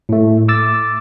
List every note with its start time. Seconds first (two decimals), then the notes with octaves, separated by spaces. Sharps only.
0.09 A2 A3
0.48 D6 E6 A6